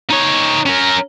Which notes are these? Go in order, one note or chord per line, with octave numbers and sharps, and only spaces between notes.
D#4 C#5
C#4 A#4